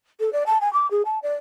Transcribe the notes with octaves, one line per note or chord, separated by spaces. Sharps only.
A4
D5
A5
G#5
D6
G#4
A5
D5